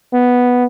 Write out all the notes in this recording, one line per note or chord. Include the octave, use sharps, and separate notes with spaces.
B3